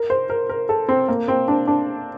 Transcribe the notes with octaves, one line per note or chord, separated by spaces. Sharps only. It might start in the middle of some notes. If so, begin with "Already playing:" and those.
Already playing: A#4
C5
A#4
A#4
A4
C4
A#3
C4
D4
D4